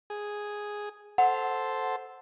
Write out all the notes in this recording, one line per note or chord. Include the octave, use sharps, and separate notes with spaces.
G#4
A4 C5 F#5